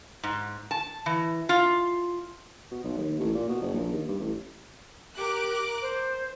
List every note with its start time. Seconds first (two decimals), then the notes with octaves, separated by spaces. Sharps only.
0.23 G#2
0.71 A5
1.06 E3
1.49 F4
2.71 B2
2.83 B1
2.97 D#2
3.19 A1
3.35 A#2
3.49 B2
3.62 F#1
3.74 A#1
3.92 D#2
4.08 G2
4.20 A1
5.17 G4 A#4 D6 F#6
5.82 C5